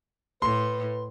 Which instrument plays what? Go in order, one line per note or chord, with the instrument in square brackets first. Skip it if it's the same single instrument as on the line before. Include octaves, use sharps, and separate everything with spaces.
[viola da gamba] A2 [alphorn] B4 [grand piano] C6